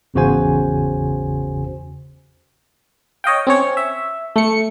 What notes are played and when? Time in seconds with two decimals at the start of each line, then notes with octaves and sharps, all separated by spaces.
0.14 G#1 E2 C#3 F#4 C5 G#5
3.24 C#5 D#5 F5 G5
3.47 C4 C#4 C#5
3.77 E5
4.36 A3 C#7